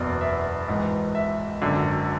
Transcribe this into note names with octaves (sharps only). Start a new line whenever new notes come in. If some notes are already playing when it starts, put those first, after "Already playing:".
Already playing: F#1 E2 B2 D5
E5
G#1 G#2 E3
E5
G#1 F#2 D3